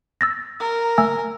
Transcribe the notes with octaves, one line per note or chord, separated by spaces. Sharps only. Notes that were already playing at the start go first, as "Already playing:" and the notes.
E6 A6 A#6
A#4
A3 G#5 E6